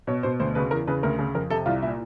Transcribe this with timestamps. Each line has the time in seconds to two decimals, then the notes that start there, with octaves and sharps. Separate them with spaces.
0.07 B2 C#5
0.23 B2 C5
0.40 D2 C5
0.55 C#3 B4
0.71 E2 A#4
0.87 C#3 B4
1.03 D2 A#4
1.19 C#3
1.35 F2 A#4
1.50 C3 A4
1.66 C2 F4
1.82 A#2 E4